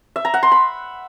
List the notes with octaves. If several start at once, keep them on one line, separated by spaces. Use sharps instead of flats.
E5
A#5
F#5
C6
B5